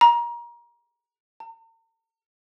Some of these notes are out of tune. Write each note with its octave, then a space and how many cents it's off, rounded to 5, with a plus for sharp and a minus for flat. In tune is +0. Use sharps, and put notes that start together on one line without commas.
A#5 +30
A#5 -45